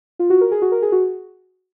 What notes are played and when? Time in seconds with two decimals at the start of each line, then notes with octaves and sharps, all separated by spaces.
0.19 F4
0.30 F#4
0.41 A#4
0.51 G#4
0.62 F#4
0.72 A#4
0.82 G#4
0.92 F#4